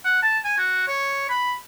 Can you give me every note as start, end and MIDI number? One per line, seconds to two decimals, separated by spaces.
0.05 0.20 78
0.22 0.39 81
0.45 0.57 80
0.58 0.84 66
0.87 1.28 73
1.29 1.54 83